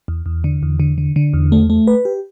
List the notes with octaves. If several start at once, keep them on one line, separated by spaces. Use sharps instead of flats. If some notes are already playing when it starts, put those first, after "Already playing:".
E2
E2
D3
E2
D3
D3
D3
E2
A3
A3
B4
G4